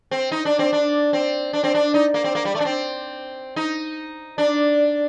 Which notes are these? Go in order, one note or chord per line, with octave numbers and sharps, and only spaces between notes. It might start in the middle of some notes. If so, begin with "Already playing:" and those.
C4
D#4
D4
C4
D4
C4
D4
C4
D4
D#4
A#3
C4
A#3
G3
A3
D4
C4
D#4
D4